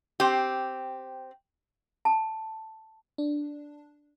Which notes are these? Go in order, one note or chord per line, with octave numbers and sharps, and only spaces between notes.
C4 G4
A5
D4